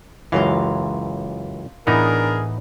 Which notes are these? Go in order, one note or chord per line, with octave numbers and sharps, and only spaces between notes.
C#2 F#2 E3 F5 A#5 C6
A2 E3 B3 D4 D#4 G#4 A#4